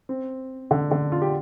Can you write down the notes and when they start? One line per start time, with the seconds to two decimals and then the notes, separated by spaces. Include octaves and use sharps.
0.09 C4
0.71 D3
0.91 D3
1.12 F4
1.22 G4